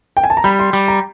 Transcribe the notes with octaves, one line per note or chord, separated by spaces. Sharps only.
G5
G#5
A5
A#5
G3 B5
C6
G3
A#5